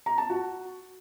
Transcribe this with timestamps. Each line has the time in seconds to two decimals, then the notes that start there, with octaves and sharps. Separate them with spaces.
0.06 A#5
0.18 A5
0.30 F#4